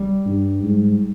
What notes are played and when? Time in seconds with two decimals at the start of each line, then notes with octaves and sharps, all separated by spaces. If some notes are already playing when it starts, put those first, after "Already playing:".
Already playing: G3
0.26 G2
0.63 G#2